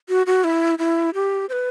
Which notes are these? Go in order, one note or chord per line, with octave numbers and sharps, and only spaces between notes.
F#4
F#4
E4
E4
G4
C5
B4